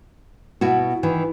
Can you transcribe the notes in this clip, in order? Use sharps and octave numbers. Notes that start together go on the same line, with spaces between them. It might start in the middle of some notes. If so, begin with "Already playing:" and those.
B2 E4 F#4
D#3 E3